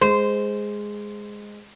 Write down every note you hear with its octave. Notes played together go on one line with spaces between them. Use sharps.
G#3 C5